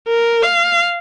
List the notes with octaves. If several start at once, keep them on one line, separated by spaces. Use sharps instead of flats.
A#4
F5